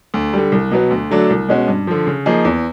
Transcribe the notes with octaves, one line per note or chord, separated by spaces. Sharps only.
D2
D3 G3
C2
B2 F#3 B3
D2
D3 F#3 A3 D4
C2
B2 G#3 C#4 F#4
G2
D3 F3
C#3
F3 A#3 D#4 G#4
E2